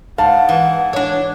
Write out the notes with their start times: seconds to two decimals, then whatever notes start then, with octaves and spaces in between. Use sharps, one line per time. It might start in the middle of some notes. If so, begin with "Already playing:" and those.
0.18 G#2 F5 F#5 A5
0.49 E3
0.93 D4 C#5